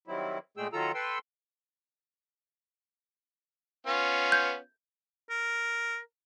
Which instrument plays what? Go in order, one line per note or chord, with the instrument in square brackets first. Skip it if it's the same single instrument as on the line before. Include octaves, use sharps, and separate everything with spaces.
[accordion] D#3 F#3 G3 C4 E4
A#2 G#3 A3 G#4 G5 E6
D#3 F#3 F4 A4 A#5 E6
A4 B4 G5 C6 E6
[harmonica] B3 C#4 F4
[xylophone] G6 G#6
[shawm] A#4